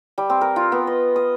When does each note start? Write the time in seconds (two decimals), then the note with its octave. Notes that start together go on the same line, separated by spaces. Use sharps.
0.18 G3
0.30 C4
0.41 A#4
0.56 F4
0.72 B3
0.87 D#5
1.16 D#6